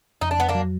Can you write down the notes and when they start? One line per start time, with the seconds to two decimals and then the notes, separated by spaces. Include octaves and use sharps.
0.21 F2 D#4
0.31 D4
0.39 F2 B3
0.48 A#3 D4
0.55 F#3